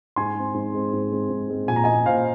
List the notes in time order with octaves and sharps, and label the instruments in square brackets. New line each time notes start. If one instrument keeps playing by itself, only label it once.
[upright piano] G#2 G#5 C6
G#3 C4
G#2
G#3 C4
G#2
G#3 C4
G#2
G#3 C4
A#2 G#5
A#5
A#3 D#5 G#5
A#2 C5 F5